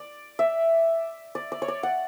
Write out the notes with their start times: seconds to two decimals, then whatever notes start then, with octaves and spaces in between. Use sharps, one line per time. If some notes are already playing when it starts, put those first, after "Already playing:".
Already playing: D5
0.39 E5
1.35 D5
1.52 D5
1.62 C#5
1.68 D5
1.83 F#5